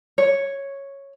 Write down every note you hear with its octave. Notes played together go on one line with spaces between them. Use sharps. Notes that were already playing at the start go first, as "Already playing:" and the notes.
C#5